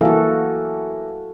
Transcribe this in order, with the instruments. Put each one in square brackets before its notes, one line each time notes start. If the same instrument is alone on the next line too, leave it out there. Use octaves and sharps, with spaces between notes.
[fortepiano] E3 A#3 [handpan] F#4 A4